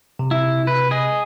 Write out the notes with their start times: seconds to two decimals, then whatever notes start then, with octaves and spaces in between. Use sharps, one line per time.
0.19 C3
0.31 E4
0.67 B4
0.91 G#4 D#5